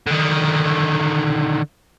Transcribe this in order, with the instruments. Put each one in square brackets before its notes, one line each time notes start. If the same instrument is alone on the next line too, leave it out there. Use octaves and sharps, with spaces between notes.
[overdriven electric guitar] D3 D#3